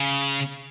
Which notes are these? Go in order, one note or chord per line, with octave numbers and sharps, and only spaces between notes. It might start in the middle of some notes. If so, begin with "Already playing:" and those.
Already playing: C#3